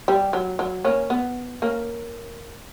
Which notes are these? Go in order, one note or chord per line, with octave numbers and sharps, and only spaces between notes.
G3
F#3
F#3
A#3 C#4
B3
A#3 C#4